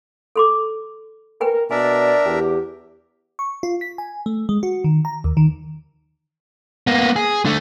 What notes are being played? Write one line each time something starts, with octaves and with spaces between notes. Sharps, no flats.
A4 C6 D6
A#4 B4 G5 G#5
B2 D4 A#4 D5 E5 G#5
E2 G4
C#6
F4
B6
G#5
A3
G#3
F#4
D#3
A#5
D#2
D#3
A#3 B3
G#4
D3 A3